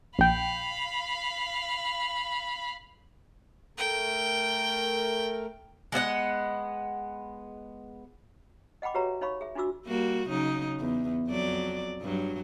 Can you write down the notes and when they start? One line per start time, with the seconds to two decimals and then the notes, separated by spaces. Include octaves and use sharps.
0.19 A#1 F5 G5 B5
3.78 A3 A#4 G5
5.92 G#3 B3 E4 F#5
8.82 D#5 F#5 G5 B5 D6
8.94 F#4 G4 B4 C#5 E5 A#5
9.21 D#4 C#5 F5 B5 C#6
9.41 G#4 E5
9.55 D4 D#4 F4 F#4 D6 E6
9.86 G3 A#3 F#4
10.29 C#3 F#3 D#4
10.79 E2
11.28 F2 F#3 D5
12.01 G2 F#3